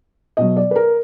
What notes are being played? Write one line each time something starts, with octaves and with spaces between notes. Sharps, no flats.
B2 F#3 D#5
D5
B4
A#4